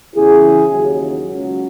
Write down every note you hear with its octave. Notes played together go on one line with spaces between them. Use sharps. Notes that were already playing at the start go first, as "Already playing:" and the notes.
E2 C#3 E3 E4 G#4
D#2 C#3 F#3
C#2 C#3 F#3